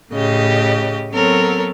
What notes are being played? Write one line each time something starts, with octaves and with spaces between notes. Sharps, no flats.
A2 C#3 G4 D#5
F#3 B3 C4 A4 A#4 C#5